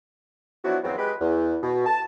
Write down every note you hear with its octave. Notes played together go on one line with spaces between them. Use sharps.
F3 F#3 B3 D4 E4 F#4
E2 G#2 F3 F#3 B3 C4
G#3 G4 B4
E2
B2
A5